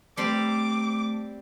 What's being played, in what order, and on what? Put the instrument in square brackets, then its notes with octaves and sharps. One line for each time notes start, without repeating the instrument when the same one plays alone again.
[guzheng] G3 C4 [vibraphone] A3 [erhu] D6